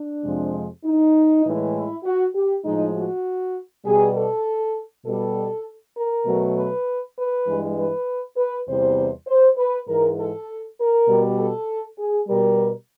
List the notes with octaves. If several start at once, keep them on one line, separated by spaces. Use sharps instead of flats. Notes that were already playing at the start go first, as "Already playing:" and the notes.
Already playing: D4
F2 C3 F3 G#3
D#4
A2 E3 G#3
E4
F#4
G4
A2 F3 G#3 D#4
F#4
B2 G3 G#4
A4
B2 G3 A4
A#4
B2 F#3 A3
B4
B4
G2 E3 G#3
B4
B4
E2 C3 E3 G3 C5
C5
B4
G#2 E3 G#3 A#4
A4
A#4
B2 G3
A4
G#4
B2 G3 A#4